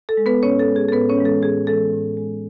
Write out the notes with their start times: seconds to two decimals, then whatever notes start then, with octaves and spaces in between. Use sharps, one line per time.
0.09 A4
0.17 G#3
0.26 B3 B4
0.42 A2 C#4 C#5
0.59 A4
0.67 G#3
0.76 G#4
0.88 A4
0.92 A2 B3 B4
1.10 C#4 C#5
1.17 E3 G#3
1.25 A4
1.42 A2 G#4
1.67 E3 G#3 A4
1.93 A2
2.17 G#3